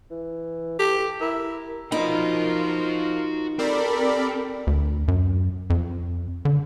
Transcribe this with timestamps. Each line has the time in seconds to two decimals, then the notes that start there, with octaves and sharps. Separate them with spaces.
0.10 E3
0.79 G4 A4
1.21 E4 A#4
1.92 F3 D#4 F4 F#4 A#4 B5
3.59 C4 G4 A4 A#4 D5 B5
4.67 D2
5.08 F#2
5.70 F2
6.45 D3